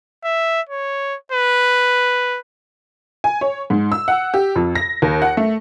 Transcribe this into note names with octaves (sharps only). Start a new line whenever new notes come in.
E5
C#5
B4
G#5
C#5
G#2
E6
F#5
G4
F2
A#6
D#2
F#5
A3